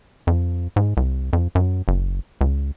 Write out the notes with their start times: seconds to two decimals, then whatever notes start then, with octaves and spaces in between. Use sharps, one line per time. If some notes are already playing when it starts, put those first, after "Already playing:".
0.27 F2
0.76 G#2
0.97 C2
1.33 F2
1.55 F#2
1.88 F#1
2.41 C#2